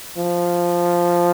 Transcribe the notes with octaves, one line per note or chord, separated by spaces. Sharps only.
F3